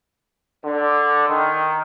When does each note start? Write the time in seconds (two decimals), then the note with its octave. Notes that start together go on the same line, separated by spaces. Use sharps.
0.65 D3
1.28 D#3